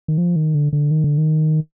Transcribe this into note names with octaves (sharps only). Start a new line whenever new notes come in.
D#3
F3
D#3
D3
D3
D#3
D3
D#3